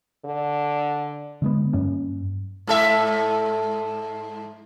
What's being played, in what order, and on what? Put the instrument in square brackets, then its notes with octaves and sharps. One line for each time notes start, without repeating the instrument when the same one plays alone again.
[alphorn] D3
[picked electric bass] D3 G#3 B3
G2 F#3 A#3 C#4
[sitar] G#2 A4 E5